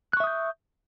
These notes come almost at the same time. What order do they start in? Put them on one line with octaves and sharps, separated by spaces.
F#6 C#6 E5 D#6 G6